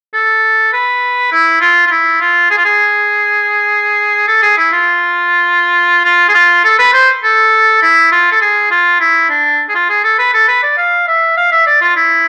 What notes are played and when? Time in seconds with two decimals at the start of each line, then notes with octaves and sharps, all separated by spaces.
0.14 A4
0.73 B4
1.32 E4
1.61 F4
1.87 F4
1.91 E4
2.21 F4
2.51 G#4
2.58 F4
2.65 G#4
4.28 A4
4.42 G#4
4.58 E4
4.72 F4
6.05 F4
6.29 G#4
6.34 F4
6.64 A4
6.79 B4
6.94 C5
7.23 A4
7.82 E4
8.12 F4
8.32 A4
8.41 G#4
8.71 F4
9.00 E4
9.30 D4
9.69 G#4
9.75 F4
9.89 G#4
10.04 A4
10.19 B4
10.34 A4
10.48 B4
10.63 D5
10.78 F5
11.08 E5
11.37 F5
11.52 E5
11.67 D5
11.81 F4
11.96 E4